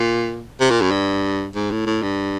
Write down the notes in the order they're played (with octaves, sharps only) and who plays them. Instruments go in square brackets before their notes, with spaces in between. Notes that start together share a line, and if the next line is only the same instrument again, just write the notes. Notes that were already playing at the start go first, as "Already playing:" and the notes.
Already playing: [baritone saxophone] A#2
C3
A#2
F#2
G2
G#2
A2
A2
G2